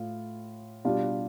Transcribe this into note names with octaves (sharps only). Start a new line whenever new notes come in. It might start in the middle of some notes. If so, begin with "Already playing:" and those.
Already playing: A2 F4
B2 G3 D4 F4